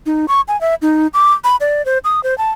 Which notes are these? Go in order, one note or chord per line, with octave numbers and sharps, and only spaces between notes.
D#4
C#6
G#5
E5
D#4
D6
B5
D5
C5
D#6
C5
A5